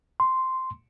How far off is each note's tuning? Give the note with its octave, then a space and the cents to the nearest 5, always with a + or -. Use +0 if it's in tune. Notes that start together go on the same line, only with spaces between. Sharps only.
C6 -5